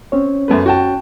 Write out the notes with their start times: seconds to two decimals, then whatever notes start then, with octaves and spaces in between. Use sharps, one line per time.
0.12 C4 C#4 C#5
0.48 F#2 A3 B4
0.66 F#4 G5 A5